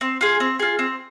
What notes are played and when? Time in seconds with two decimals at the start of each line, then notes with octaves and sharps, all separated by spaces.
0.01 C4
0.21 F4 G#4
0.40 C4
0.59 F4 G#4
0.79 C4